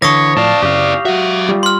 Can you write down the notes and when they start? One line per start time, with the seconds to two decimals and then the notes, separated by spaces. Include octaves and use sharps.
0.02 D3 E3 C#5 C#6 D#6 A#6
0.37 A2 F3 E4 D5 F5 A5
0.62 F#2 C#3 G4 F5
1.05 F#3 F#4 E5
1.49 G3 F4
1.63 C6 F6